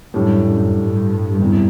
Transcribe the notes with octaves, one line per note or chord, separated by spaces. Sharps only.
F#2 A2 G3 D4
F#2
G2
E2 C3 E3